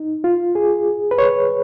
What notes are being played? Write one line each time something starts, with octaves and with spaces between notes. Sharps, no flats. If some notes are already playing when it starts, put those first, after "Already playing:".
Already playing: D#4
F4
G#4
B4
C#5